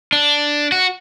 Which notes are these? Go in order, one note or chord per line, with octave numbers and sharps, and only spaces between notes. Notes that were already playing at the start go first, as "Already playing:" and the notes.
D4
F#4